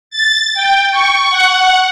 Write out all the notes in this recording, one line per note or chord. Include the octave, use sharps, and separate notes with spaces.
A6
G5
C#6
F#5